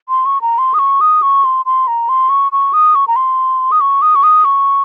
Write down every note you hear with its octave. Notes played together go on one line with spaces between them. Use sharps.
C6
C#6
A#5
C6
D#6
C#6
D#6
C#6
C6
C6
A#5
C6
C#6
C#6
D#6
C#6
A#5
C6
D#6
C#6
D#6
C#6
D#6
C#6